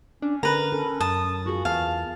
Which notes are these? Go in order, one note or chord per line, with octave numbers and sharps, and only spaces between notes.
C#4 D4
D3 A#4 B4 A#5
C#4 A4
F#2 A5 D#6
F4 F#4 G#4
E2 F5 A5